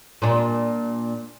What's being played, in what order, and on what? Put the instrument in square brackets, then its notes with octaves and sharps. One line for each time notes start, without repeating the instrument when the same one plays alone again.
[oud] A#2 D4